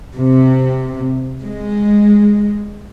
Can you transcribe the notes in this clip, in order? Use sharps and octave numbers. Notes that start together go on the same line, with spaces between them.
C3
G#3